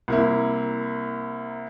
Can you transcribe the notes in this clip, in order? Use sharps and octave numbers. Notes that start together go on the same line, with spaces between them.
C2 A#3 E4